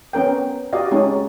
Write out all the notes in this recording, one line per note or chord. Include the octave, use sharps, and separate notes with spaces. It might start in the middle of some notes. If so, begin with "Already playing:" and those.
B3 C#4 A#4 G5
F#4 G4 D5 D#5 F5
G#3 C#4 D#4 F#4